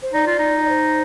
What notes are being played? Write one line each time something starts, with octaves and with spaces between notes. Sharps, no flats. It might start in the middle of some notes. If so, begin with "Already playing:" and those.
C5
D#4 D5
F4
D#4
D5
C5